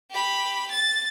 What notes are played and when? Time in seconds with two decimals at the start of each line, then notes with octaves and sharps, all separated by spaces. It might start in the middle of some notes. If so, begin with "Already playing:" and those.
0.11 G4 B5
0.71 A6